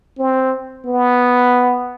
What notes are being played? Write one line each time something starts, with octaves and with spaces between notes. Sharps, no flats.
C4
B3